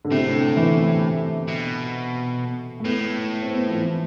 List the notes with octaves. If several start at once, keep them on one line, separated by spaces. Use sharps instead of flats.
D3
A2 C3
D3
E3
D3
D3
B2
A3
A2 B3
C4
B3
F3
E3